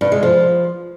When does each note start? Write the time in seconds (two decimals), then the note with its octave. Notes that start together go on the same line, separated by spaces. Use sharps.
0.01 G2
0.12 G#3
0.23 F3